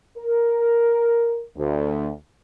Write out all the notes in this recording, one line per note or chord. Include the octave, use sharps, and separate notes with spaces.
A#4
D2